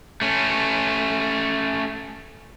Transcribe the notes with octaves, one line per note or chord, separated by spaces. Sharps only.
A3 C#4